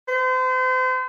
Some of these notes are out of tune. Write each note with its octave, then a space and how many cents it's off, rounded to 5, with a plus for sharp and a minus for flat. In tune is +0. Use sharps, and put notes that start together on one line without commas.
C5 -35